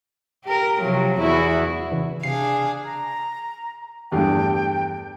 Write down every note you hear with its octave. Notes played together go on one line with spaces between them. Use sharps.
G4 A#4
C3 F3 F#3
E2 E4 F#4
C#3 E3
C3 D4 G#4 F5 C7
A#5
E2 G2 A3 G5